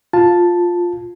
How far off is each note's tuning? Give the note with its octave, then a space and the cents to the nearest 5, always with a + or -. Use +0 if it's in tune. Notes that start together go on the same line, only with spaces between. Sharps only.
F4 +5 A5 +0